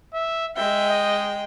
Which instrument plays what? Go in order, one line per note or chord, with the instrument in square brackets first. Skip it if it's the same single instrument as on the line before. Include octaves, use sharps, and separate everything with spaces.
[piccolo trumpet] E5
[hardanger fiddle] G#3 G5 [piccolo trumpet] E5
[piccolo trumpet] D#5